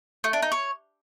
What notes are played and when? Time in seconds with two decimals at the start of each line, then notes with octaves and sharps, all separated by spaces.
0.24 A3
0.33 D4
0.42 D#4
0.52 C#5